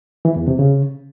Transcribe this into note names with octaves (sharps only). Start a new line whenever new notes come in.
E3
E2
C3
C#3